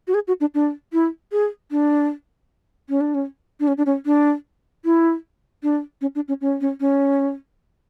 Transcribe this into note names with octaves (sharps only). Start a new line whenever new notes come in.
F#4
G#4
F#4
D4
D4
E4
G#4
D4
C#4
D4
C#4
D4
C#4
D4
C#4
D4
E4
D4
C#4
D4
C#4
C#4
C#4
C#4